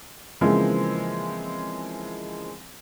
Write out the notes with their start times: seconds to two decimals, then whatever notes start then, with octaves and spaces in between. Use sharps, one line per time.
0.41 C#3 E3 F3 G#3 A#3 C4